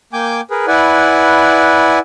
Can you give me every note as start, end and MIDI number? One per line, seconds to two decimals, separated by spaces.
0.13 0.41 58
0.13 0.41 79
0.13 0.41 80
0.13 0.41 86
0.13 0.41 91
0.50 0.66 68
0.50 0.66 70
0.50 0.66 71
0.67 1.99 64
0.67 1.99 71
0.67 1.99 74
0.67 1.99 78
0.67 1.99 80